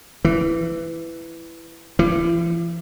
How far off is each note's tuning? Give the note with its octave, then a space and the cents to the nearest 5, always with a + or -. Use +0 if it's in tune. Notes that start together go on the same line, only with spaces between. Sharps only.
E3 +10
E3 +40